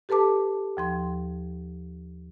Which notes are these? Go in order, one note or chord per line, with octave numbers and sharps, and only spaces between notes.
G4 A4 B4 A5 D6
D#2 F3 C6